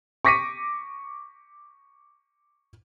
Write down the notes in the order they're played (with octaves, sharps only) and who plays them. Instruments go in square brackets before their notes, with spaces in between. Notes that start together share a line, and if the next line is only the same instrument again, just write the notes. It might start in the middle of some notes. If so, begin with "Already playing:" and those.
[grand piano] C#6 D6 A#6 B6 C#7 D#7